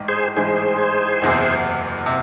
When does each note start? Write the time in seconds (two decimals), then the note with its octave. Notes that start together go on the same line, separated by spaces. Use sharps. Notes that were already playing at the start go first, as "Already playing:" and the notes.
Already playing: A1 G#2
0.08 G#4 C5
0.36 A1 G#2 E3 G#4 C5
1.21 F#1 E2 C3
2.06 C3